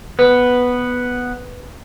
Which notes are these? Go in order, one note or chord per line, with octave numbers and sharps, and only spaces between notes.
B3 B4